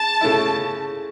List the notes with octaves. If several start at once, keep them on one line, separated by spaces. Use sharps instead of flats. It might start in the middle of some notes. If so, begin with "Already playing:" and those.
Already playing: C#3 A5
C#3 A3 C#4 E4